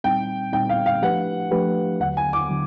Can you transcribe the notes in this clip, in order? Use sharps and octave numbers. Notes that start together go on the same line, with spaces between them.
A#2 G3 C4 D#4 G5
A#2 G3 C4 D#4 G5
F5
F5
F3 A3 D4 G4 B4 F#5
F3 A3 D4 G4 B4
D#2 D3 F#3 F#5
G#5
D6
D3 F#3